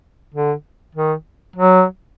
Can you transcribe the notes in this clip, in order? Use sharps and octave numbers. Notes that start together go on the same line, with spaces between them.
D3
D#3
F#3